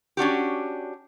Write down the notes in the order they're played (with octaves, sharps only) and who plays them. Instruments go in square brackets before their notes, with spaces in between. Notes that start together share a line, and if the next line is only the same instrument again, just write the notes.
[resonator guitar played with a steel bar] C#4 D4 F#4 G4